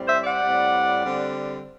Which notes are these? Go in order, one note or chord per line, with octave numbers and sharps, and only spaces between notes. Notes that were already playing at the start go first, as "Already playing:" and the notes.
Already playing: A2 G3 C4
C5 E5
D5 F#5
A2 G3 C4
D3 G3 C4